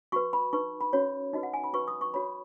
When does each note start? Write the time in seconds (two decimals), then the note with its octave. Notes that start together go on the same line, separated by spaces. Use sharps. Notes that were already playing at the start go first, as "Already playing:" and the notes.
0.12 F#4 B4 C#6
0.33 B5
0.53 D#4 B4 C#6
0.81 B5
0.93 C#4 F#4 C#5
1.33 D#4 F#4 B4 D#5
1.43 F#5
1.54 G#5
1.64 B5
1.73 F#4 B4 C#6
1.88 D#6
2.01 C#6
2.14 F#4 C#5 B5